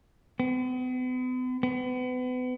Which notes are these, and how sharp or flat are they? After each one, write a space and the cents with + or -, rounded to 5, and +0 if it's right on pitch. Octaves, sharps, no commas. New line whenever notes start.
B3 +45
B3 +35